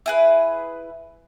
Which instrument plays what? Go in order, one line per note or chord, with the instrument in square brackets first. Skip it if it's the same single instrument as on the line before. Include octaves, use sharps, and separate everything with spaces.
[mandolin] E4 G#4 B4